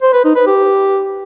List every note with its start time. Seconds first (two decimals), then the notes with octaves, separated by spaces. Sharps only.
0.02 C5
0.13 B4
0.24 D#4
0.36 B4
0.47 G4